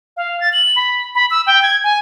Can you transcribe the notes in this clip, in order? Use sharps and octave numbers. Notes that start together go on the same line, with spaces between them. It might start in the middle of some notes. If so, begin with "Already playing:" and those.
F5
A6
F#7
B5
B5
E6
G5
G#6
G#5